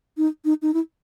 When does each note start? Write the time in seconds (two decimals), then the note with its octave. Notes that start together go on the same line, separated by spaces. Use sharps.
0.17 D#4
0.45 D#4
0.62 D#4
0.74 E4